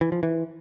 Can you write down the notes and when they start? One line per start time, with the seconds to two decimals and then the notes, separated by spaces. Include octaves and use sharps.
0.01 E3
0.12 F3
0.23 E3